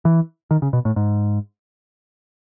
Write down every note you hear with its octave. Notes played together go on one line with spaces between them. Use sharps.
E3
D#3
C#3
B2
A2
G#2